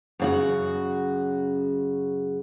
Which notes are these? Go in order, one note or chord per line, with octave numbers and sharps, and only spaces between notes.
F#2 C#3 F#4